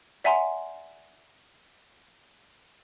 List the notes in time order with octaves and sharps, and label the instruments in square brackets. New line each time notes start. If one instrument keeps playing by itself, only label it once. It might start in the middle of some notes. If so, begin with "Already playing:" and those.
[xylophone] D5 E5 F#5 G#5 A#5 C6